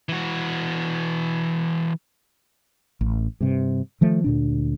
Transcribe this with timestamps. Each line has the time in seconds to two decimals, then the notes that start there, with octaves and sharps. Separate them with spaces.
0.09 E3 F#4
3.01 A1
3.41 G2 C3
4.01 D#3 F3 A3
4.24 D2 A#2 D4